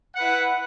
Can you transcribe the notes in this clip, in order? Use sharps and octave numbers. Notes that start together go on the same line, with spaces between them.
E4 B4 F#5